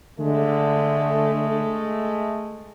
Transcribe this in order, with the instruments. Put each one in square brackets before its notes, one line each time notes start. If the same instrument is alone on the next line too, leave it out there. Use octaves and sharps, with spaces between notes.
[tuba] D3 [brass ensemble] G#3 A3